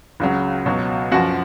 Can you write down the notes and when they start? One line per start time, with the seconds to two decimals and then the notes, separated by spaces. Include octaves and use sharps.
0.20 C#2 C#3 F#3
0.66 C#2 B2 F#3
1.12 F#2 F3 F#4 F#5